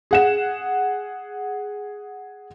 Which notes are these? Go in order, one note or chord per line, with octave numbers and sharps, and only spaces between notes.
G#4 F#5 E7